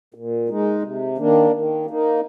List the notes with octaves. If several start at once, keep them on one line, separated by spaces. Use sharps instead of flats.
A#2
G#3 D#4
C3
D#3 A#3 D4
D#3
A#3 D#4